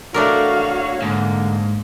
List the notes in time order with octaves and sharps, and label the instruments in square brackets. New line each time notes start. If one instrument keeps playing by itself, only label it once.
[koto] A3 D4 A#4 [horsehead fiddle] F#4 F5 [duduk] C#5
[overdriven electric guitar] G#2 [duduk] D3 [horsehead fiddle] A#3